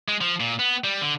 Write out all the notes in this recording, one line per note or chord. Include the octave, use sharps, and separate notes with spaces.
G#3
F3
A#2
B3
G3
D3